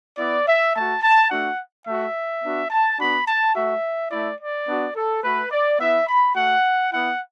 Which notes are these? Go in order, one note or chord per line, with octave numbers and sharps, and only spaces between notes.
B3 E4 D5
E5
A3 F#4 A5
A5
A3 D4 F#4 F#5
A3 F#4 E5
B3 D4 F#4
A5
B3 D4 F#4 B5
A5
A3 F#4 E5
A3 E4 D5
D5
B3 D4 F#4
A4
A3 F#4 B4
D5
B3 E4 E5
B5
A3 F#4 F#5
B3 E4 F#5